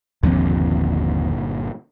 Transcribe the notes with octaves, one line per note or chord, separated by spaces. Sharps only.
G1 D#2 A#2 D3 F3 C4